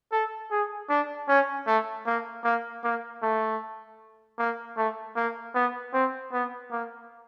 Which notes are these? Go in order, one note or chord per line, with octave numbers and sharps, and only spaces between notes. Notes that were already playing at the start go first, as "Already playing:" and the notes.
A4
G#4
D4
C#4
A3
A#3
A#3
A#3
A3
A#3
A3
A#3
B3
C4
B3
A#3